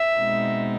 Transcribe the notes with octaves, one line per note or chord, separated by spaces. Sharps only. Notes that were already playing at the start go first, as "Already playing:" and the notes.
Already playing: E5
B2 G#3 C4 D#4